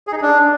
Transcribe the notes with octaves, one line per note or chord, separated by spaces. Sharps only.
G#4
D#4
G#4
D4